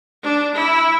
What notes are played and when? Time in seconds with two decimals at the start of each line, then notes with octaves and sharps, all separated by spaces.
0.23 D4
0.54 E4